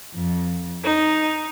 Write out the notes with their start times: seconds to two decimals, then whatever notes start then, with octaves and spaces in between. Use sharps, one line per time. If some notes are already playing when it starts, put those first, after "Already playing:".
0.13 F2
0.83 D#4